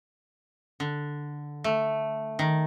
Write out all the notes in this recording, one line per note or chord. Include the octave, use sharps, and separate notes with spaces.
D3
A3
D#3